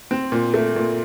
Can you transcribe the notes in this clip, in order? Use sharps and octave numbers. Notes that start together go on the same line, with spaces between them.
C4
A#2
A3
A#2